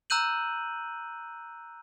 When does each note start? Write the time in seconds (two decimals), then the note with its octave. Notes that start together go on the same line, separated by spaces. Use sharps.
0.10 A#5 E6 F#6 G6 D#7 F#7